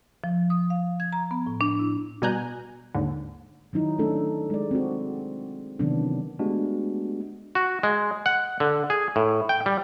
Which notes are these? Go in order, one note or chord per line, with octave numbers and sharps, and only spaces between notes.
F3
D#6
F5
G#6
A#5
B3
A2
D4
E4
B2 G3 G#5 A#5 F#6 G6
D#2 G#2 D3
D#3 F#3 D#4 E4
A3 C#4 D4 A4
G#3 D5
C4 F#4
C3 D#3 E3 F#3 B3 D4
G#3 A3 B3 D4 F#4 G4
F#4
G#3
F#5
D3
G#4
A2
G5
G3